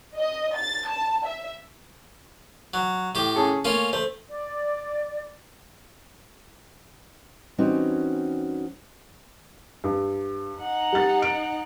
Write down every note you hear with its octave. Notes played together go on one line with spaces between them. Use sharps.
D#5
A6
A5
E5
F#3
A2 G4
C#4 G#4 A4
A3 A#3 C#4 F4 C#5
A3 C5
D5
E3 G3 C4 C#4 D#4 F#4
G2
D#4 F#5
G3 A6
D7